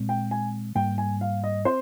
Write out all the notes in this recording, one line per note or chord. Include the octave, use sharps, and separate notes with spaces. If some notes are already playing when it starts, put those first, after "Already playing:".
Already playing: A#2 G#3 C4
G5
G#5
G#2 G3 A#3 G5
G#5
F5
D#5
C4 C5